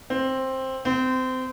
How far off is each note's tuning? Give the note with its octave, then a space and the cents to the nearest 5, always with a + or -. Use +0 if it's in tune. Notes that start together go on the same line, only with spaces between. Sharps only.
C4 +10
C4 -25